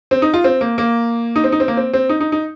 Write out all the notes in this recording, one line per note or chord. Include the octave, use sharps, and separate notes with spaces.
C4
D#4
F4
C4
A#3
A#3
D#4
C4
D#4
C4
A#3
C4
C4
D#4
D#4
D#4